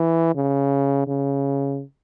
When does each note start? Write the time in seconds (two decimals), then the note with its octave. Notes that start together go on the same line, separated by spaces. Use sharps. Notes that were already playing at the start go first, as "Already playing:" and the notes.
Already playing: E3
0.35 C#3
1.07 C#3